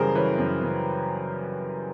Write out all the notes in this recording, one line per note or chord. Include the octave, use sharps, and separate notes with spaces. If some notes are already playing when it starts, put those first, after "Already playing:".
Already playing: F#2 C#3 E3 G3 G#4 A#4 C5
E3 B4 C#5
F#2
C#3